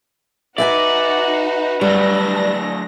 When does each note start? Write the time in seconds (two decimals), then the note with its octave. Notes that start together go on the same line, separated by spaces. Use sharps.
0.58 D#4 F#4 B4 D5 E5 G5 G#5
1.81 F#3 G3 A3 D4 A#6